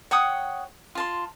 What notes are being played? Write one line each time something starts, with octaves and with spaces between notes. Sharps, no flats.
C#5 F#5 G5 D#6
F4 A5 C6